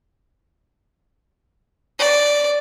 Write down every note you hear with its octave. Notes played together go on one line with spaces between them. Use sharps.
D5